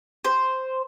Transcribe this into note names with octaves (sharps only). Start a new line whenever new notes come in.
C5